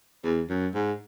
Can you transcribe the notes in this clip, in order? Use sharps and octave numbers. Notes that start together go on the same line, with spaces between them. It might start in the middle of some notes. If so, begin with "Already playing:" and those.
E2
F#2
G#2